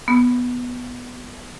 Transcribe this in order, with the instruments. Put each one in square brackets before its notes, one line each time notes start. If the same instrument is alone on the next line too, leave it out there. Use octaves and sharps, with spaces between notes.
[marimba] B3